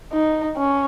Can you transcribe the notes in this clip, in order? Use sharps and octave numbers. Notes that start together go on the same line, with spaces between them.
D#4
C#4